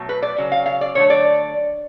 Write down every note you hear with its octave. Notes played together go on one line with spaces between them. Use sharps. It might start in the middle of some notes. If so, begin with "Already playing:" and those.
Already playing: B2 F#3 A3
B4
D5
C#3 F#3
F5
F5
D5
D3 F#3 A3 C#5
D5